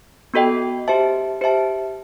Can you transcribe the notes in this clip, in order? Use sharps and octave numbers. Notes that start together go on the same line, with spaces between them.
B3 F#4 A4 D#5 G5
G4 C5 E5 A5
G4 C5 E5 A5